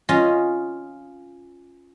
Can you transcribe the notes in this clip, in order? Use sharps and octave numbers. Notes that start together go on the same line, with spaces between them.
C#4 F4 D#5